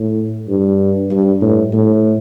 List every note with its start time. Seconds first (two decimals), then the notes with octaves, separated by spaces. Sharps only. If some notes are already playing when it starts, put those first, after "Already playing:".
Already playing: A2
0.48 G2
1.11 G2
1.42 A2
1.73 A2